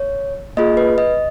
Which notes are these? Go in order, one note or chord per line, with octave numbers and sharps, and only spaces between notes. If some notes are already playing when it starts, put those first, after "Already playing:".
Already playing: C#5
A#3 F4 G#4 D#5
B4
D#5